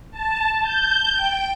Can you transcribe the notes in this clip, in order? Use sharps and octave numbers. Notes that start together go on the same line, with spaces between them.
A5
G6
G5